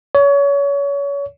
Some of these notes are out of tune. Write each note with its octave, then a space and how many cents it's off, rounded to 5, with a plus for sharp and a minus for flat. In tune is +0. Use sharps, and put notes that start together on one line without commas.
C#5 +30